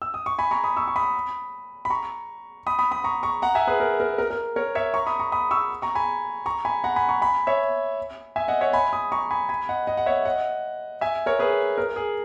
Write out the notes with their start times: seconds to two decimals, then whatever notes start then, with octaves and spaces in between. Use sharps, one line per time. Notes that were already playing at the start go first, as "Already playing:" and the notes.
0.02 E6
0.14 D#6
0.26 C#6
0.39 G#5 B5
0.51 A#5 C#6
0.64 B5 D#6
0.77 C#6 E6
0.88 C#6
0.96 B5 D#6
1.85 B5
1.90 A#5 C#6
2.67 B5 D#6
2.79 B5 D#6
2.91 B5 D#6
3.04 A#5 C#6
3.23 A#5 C#6
3.42 F#5 A#5
3.55 E5 G#5
3.67 G#4 B4
3.80 A#4
4.00 A#4
4.18 A#4
4.31 A#4
4.56 A#4 C#5
4.75 C#5 E5
4.94 A#5 C#6
5.06 B5 D#6
5.19 A#5 C#6
5.32 B5 D#6
5.51 C#6 E6
5.82 A#5 C#6
5.95 G#5 B5
6.46 A#5 C#6
6.65 G#5 B5
6.84 F#5 A#5
6.96 G#5 B5
7.09 A#5 C#6
7.22 G#5 B5
7.47 C#5 E5
8.36 E5 G#5
8.48 D#5 F#5
8.61 C#5 E5
8.73 G#5 B5
8.93 B5 D#6
9.12 A#5 C#6
9.31 G#5 B5
9.49 G#5 B5
9.69 D#5 F#5
9.87 D#5 F#5
9.97 F#5
10.06 C#5 E5
10.25 D#5 F#5
11.01 E5 G#5
11.26 A#4 C#5
11.39 G#4 B4
11.78 A#4
11.96 G#4